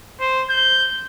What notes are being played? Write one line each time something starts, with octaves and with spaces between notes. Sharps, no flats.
C5
G6